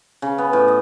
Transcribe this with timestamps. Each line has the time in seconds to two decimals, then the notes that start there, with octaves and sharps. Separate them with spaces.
0.22 C#3
0.38 B3
0.53 A2
0.68 D#5